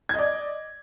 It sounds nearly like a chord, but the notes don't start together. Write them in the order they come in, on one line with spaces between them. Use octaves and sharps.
G#6 D#5 D5